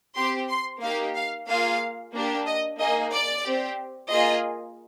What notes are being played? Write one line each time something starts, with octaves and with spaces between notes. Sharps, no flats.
C4 G4 C6
C6
A#3 D#4 G4 F5
F5
A#3 F4 G#4 F5
A#3 D4 G4
D#5
A#3 D#4 G#4 D#5
D5
C4 G4
A#3 F4 G#4 D#5